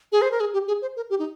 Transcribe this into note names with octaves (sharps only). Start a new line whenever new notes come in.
G#4
C5
A#4
G#4
G4
G#4
C5
A#4
G4
D#4